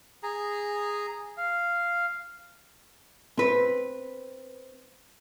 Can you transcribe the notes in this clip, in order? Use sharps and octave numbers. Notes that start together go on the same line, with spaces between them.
G#4 A#5
F5
C4 B4